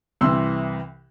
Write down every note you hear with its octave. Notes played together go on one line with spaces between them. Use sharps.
C2 C3 E3 C6 E6